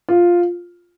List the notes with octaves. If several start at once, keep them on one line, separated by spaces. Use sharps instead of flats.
F4